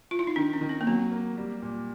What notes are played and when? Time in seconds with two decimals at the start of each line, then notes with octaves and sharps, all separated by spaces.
0.11 F4
0.19 E4
0.27 D#4
0.36 D#3 D4
0.53 C#4
0.61 D#3
0.69 C4
0.81 A#3
0.87 F#3 B3
1.11 A#3
1.37 G3
1.62 A#2